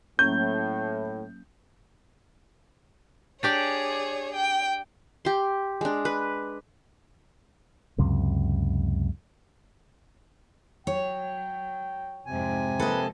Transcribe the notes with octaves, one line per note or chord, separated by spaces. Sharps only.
A2 F#3 A#3 C#4 G6
D4 G4 G#4 C#5 D5
G5
G4 C6
G#3 D4
B4
C#2 F#2 C3
F#3 C#5 G5
F2 G#2 C3 G#5
F3 G#3 A#3 A4 B4 D#5